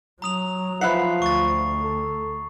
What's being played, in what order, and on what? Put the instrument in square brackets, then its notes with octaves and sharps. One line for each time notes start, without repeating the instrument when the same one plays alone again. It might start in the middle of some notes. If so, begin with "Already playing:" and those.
[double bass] F#3 [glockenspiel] A#5 D#6 F7
[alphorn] F3 [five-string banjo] B4 E5 F#5 [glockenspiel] C7
[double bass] D2 [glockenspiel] C#6 A6
[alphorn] A4